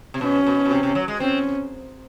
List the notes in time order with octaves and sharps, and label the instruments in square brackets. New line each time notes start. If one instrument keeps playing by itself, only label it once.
[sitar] C3
[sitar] B2 [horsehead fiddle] C#4
[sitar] B2
B2
C3
C3
F#3
G#3
[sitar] C4 [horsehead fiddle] C#4